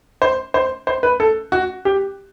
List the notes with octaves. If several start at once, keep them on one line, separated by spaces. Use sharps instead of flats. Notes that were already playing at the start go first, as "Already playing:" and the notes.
C5
C5
C5
B4
A4
F#4
G4